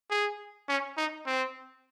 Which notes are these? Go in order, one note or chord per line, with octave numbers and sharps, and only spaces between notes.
G#4
C#4
D#4
C4